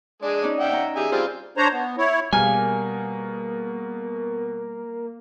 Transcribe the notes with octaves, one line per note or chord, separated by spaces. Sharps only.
G#3 D4 G#4 D5
C#4 D#4 D5
E5 F#5 G5
C#4 A#5
E4 G4 G#4 E5 G#5
G3 C4 F4 G#4 C5
D4 C5 C#5 A#5
B3
E4 C#5
B2 G3 A#3 G#4 G#5 F6